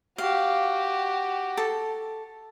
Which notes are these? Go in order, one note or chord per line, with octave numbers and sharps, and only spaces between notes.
F#4 G4 F5
A4 A5